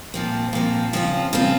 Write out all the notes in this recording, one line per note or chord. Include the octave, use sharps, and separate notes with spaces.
A#2 F3 C4
A#2 F3 C4
C#3 F3 C4 F4
C#3 F3 C4 F4